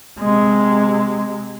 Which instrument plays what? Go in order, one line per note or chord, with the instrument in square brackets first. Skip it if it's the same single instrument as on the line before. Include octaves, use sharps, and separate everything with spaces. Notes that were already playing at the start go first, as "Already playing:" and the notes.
[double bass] C3 G#3